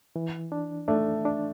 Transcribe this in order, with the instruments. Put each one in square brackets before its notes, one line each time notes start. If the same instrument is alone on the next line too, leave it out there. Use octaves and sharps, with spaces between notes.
[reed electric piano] E3
D4
[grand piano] A3 [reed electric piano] D4
[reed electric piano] D4